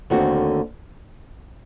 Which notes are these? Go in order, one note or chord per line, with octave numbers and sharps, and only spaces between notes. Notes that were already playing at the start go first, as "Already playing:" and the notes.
D#2 D3 A3 C4 F#4